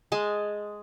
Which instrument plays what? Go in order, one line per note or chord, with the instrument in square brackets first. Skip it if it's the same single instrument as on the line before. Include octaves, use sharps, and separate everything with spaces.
[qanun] G#3 G#5 A5